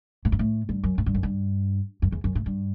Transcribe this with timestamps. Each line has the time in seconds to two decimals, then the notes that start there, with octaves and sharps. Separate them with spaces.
0.25 A2
0.32 G2
0.39 A2
0.69 G2
0.83 F#2
0.98 A2
1.06 G2
1.14 F#2
1.23 G2
2.02 F#2
2.12 E2
2.24 F#2
2.35 A2
2.46 G2